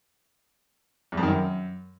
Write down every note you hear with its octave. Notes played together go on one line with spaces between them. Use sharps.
E2
F2
D#3
F#2